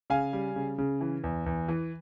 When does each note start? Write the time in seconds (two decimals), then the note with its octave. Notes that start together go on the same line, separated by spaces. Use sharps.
0.10 C#3 F5 G#5
0.33 G3
0.56 C#3
0.78 C#3
1.01 E3
1.24 E2
1.46 E2
1.68 E3